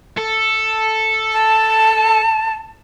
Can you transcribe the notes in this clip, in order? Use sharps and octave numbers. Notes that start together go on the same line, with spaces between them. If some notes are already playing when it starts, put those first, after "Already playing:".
A4
A5